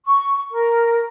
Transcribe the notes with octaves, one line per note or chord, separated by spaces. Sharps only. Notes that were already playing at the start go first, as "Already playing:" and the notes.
C#6
A#4